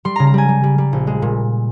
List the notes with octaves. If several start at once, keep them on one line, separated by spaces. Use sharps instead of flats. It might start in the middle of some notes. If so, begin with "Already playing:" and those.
G3 C6
C#3 A#5
A#5
G3 G#5
G3
G3
G3
A#1
G#3
A#2